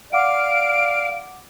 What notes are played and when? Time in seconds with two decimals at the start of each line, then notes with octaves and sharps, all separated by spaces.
0.13 D5 F5 F#5 D6 D7